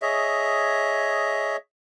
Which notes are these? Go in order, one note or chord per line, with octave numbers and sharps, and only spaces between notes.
G#4 C#5 D#5 E5